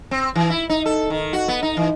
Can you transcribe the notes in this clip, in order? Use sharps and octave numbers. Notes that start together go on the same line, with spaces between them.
C4
E3
E4
D#4
A4
D#3
F#4
B3
D#4
E3